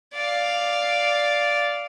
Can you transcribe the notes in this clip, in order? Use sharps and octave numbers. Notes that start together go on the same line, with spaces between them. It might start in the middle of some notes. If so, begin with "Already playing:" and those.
D5 F5